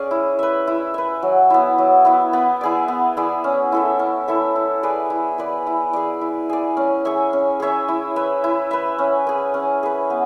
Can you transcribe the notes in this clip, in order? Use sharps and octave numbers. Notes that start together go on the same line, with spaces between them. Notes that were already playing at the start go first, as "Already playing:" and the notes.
Already playing: C#4 G#4 D5
E4
B4 E5
E4
B4 E5
F#3
B3 E4
F#3
B3 E4
B3
E4 G#4 D5
B3
E4 G#4 D5
C#4
E4 A4 E5
C#4
E4 A4 E5
E4
G#4 B4 D5
E4
G#4 B4 D5
E4
G#4 D5
E4
G#4 D5
C#4
G#4 C#5 E5
C#4
G#4 C#5 E5
E4
B4 E5
E4
B4 E5
C#4
G#4 B4
C#4
G#4 B4
B3